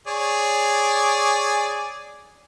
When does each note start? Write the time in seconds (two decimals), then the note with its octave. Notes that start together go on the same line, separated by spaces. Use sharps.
0.07 G#4 C#5 D5